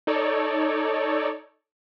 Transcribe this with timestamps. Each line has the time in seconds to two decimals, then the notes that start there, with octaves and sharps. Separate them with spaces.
0.07 D#4 A4 C#5 D5